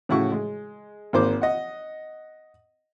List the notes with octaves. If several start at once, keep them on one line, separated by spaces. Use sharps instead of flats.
A2 C#3 E4 F#4 C#6
G#3
G#1 A#3 C5 D6
D#5 F#5